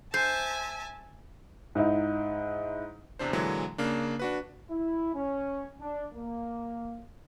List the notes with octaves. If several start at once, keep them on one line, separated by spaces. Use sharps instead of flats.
C5 E5 G#5 A5
G#2 D#4 E4
E2 C3 D4 C5
A#2 D3 E3 F#3 G#3
C#3 A#3 D4
D4 F#4 B4
E4
C#4
D4
A#3